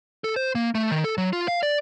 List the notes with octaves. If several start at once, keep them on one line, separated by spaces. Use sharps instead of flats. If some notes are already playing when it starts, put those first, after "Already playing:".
A4
C5
A#3
A3
D#3
A4
F#3
F4
F5
D5